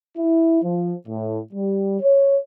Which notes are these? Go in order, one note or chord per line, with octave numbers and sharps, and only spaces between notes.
E4
F3
A2
G3
C#5